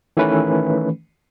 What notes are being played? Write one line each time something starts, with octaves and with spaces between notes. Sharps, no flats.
D#3 E3 A3 C#4 B4